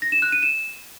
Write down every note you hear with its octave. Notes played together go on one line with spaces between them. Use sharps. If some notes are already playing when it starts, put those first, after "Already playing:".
A#6
E7
F#6
D#7
E7